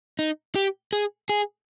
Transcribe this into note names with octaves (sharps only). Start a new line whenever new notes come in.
D#4
G4
G#4
G#4